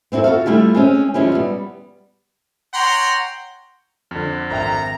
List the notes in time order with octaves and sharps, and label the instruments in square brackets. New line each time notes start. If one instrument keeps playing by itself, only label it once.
[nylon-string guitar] B3 C4 E4 F#4 A4
F4 F#4 A4 F5
G3 A3 E4 F4 G4
G#3 C4 C#4
F3 G#3 C#4 E4 G4
G3 B3
[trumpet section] C#5 F#5 G5 A#5 C6
[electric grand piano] F2 D3
[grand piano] G#1 E5 G5 [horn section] A#5